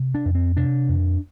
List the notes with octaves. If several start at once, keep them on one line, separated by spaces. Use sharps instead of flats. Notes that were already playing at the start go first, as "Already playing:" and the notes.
Already playing: C3
D4
F2
C4
C3 D4
F2